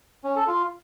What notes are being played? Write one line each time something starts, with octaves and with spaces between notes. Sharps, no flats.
C#4
A4
F4